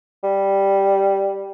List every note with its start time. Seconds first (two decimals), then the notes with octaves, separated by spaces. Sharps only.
0.23 G3